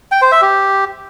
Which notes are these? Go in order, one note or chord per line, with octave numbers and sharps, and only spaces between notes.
G5
C5
E5
G4